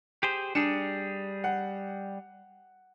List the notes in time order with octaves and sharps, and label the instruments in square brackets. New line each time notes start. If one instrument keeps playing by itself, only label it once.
[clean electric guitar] G4 G#4 C5
[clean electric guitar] G3 G#4 [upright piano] D4 C#7 E7
[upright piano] F#5